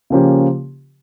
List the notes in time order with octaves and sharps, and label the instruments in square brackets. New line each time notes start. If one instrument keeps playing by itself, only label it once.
[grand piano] C#3 F3 A#3 C#4 G4